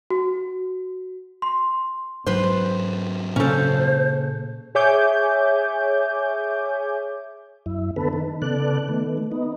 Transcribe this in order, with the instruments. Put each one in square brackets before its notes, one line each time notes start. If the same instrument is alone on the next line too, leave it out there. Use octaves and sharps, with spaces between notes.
[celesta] F#4
C6
[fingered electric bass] G#2 F#3 [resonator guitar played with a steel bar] B4 C5
[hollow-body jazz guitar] A#2 C#3 [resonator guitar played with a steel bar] C#4 A4 [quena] C5
[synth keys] G#4 C#5 E5 G#5 D6 G6
[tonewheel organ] F#2 E4
D3 B3 A4 B4
D#3
C#3 B3 A4 D5 F#6
D#3 A3 B3
B3 D#4